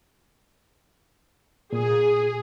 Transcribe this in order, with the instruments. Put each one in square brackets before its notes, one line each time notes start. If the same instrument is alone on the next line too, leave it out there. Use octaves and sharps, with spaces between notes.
[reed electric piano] A#2 [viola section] G#4